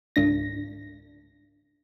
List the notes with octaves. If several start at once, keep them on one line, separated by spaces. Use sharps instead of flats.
G#1 C#2 G#2 D4 A#6